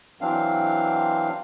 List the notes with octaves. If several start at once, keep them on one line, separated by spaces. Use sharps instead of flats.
E3 F#3 C4 D4 F5